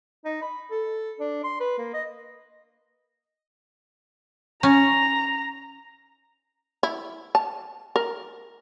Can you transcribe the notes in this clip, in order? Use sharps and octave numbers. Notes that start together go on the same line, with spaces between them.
D#4
B5
A4
D4
C6
B4
A#3
D#5
C#4 A#5
E4
A5
A#4